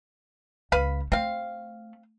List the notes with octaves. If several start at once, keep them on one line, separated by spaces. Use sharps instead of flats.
C#2 B4 F5 B5
A3 C4 F5